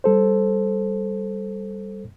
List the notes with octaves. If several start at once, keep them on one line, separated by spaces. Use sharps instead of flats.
G3 A4 C5